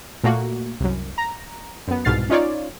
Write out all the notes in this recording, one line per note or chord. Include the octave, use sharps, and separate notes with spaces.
A#2 A3 A#3 F#4
C2 F#2
A#5
F#2 B3
C2 G#2 B2 F6 A6 C7
C#4 D#4 F4 C#5 D5